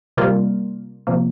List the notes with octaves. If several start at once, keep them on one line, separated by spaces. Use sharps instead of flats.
C3 G3 A#3 F4
C3 F3 A#3